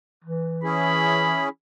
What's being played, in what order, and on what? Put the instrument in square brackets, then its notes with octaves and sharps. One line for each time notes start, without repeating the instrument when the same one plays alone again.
[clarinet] E3
[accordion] C#4 E4 G#4 [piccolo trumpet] B5